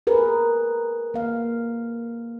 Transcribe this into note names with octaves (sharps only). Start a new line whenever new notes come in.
G#4 A#4 B4
A#3 F5